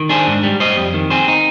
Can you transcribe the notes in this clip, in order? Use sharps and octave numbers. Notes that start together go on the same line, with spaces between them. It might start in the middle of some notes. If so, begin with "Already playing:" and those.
Already playing: D#3
D4 G#4 C5
G#2
G3
G3 C5 D#5
F2
D#3
C4 G#4 C5
D#4